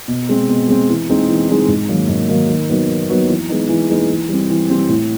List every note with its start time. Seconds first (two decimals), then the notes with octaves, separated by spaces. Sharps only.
0.08 B2
0.29 G#3 C4
0.49 B2
0.68 G#3 C4
0.89 E3
1.09 G#3 C4 D#4
1.29 E3
1.49 G#3 C4 D#4
1.68 G#2
1.88 D#3 F#3 A#3
2.09 G#2
2.29 D#3 F#3 A#3
2.49 D#3
2.69 F#3 B3 D#4 F#4
2.89 D#3
3.09 F#3 B3 D#4 F#4
3.28 E3
3.49 G#3 B3 D#4
3.69 E3
3.89 G#3 B3 D#4
4.10 E3
4.29 G3 C4
4.50 E3
4.70 G3 C4
4.89 A2